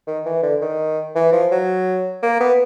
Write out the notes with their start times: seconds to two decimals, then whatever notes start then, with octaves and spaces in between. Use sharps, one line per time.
0.07 D#3
0.25 E3
0.43 D3
0.61 D#3
1.15 E3
1.33 F3
1.51 F#3
2.23 A#3
2.40 B3